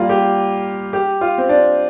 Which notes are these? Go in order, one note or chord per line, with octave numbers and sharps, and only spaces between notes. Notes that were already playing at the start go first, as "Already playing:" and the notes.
Already playing: G3 A#3 F4
G4
G4
F4
C4
D4